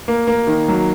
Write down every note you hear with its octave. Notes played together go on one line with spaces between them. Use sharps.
A#3
A#3
D#3
F#3